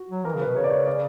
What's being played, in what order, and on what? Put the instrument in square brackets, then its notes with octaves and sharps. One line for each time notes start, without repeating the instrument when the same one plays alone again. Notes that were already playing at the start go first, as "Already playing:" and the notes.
Already playing: [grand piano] F#4
[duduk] F#3
[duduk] E3 [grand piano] A#4
[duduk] C#3
[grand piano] B4
[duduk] B2
[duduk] C#3 [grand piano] C#5
[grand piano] D5
C#5
D5